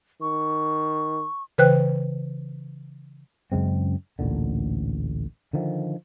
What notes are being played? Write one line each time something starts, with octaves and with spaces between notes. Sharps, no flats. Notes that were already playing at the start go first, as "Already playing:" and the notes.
D#3 C#6
C#3 E3 B4 C5 G5 F#6
F#2 C#3 G#3 C4
A1 D2 A#2 D3
D3 D#3 F3